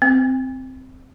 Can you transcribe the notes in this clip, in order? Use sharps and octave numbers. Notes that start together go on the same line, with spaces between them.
C4